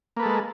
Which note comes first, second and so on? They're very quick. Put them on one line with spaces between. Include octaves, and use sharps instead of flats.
A#3 B4 A4 G#3